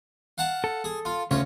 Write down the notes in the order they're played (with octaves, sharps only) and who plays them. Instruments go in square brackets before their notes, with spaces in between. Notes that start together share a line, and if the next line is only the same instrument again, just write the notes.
[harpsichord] F5 F#5 A5
[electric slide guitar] A4
[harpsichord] G#4
F4
[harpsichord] D2 F4 C#5 [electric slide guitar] C#3 C#4